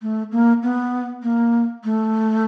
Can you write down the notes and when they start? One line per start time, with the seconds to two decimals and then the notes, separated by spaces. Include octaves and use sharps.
0.02 A3
0.32 A#3
0.63 B3
1.22 A#3
1.84 A3